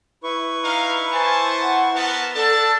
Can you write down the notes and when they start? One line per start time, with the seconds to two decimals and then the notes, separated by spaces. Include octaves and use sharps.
0.23 E4 B4 C#6
0.64 D#4 F5 A#5
1.13 C5 G#5 A5
1.62 F#5
1.94 B3 A#4 A5
2.36 D4 A4 A5